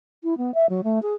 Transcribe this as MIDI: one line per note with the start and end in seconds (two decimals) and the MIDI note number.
0.24 0.37 64
0.38 0.54 59
0.54 0.66 76
0.69 0.81 54
0.84 1.02 57
1.02 1.14 68